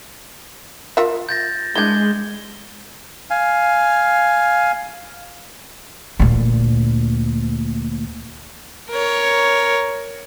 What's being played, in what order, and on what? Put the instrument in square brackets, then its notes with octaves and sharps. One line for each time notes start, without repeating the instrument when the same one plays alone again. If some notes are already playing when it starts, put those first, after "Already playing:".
[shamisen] F4 A#4 E5
[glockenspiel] G6 A6 A#6
[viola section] G#3 [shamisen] D4 E4 [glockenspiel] G6 G#6 G7
[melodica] F5 G#5
[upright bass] D2 A#2
[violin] A#4 C#5